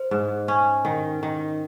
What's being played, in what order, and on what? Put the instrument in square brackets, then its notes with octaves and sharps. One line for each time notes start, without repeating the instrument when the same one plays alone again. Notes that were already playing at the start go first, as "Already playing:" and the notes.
Already playing: [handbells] C5
[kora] G#2
C#4
D#3
D#3